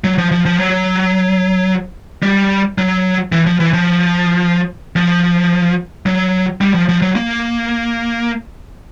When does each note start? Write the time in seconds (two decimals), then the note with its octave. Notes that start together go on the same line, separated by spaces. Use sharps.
0.04 F#3
0.18 F3
0.31 F3
0.46 F3
0.58 F#3
2.23 G3
2.78 F#3
3.32 E3
3.46 F3
3.60 E3
3.74 F3
4.96 F3
6.06 F#3
6.61 G3
6.74 F3
6.89 F3
7.02 F#3
7.15 A#3